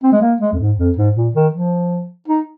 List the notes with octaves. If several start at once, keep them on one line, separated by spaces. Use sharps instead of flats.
C4
G#3
A#3
G#3
F2
G#2
F2
G#2
A#2
D#3
F3
D#4